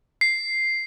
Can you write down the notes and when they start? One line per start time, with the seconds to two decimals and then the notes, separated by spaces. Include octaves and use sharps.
0.21 C7